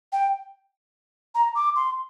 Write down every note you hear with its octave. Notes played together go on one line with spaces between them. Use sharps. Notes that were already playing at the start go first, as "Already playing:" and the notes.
G5
A#5
D6
C6